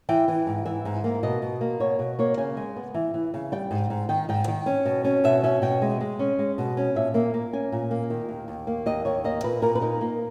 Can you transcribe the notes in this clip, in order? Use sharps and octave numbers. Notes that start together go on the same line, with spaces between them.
E3 G5
E3
G#2
E3 E5
G#2
A#3
B2 D#5
B2
A#3
B2 C#5
B2
A#3 C#5
C#3 G#5
G#3
B3
E3
E3
C#3
G3 G5
G#2
G#2
D#3 G5
G#2 G5
D#3 G5
C#4
B2
C#4
B2 E5
C#4 E5
B2 G5
G#3
G#3
C#4
G#3
B2
C#4
A#2 E5
A#3 E5
A#3
C#4 G#5
A#2
A#3
D#3
D#2
D#2
A#3
D#2 D#5
D#2 C#5
A#3 D#5
A#2 B4
A#2 A#4
B4
D#4 A#4
A#3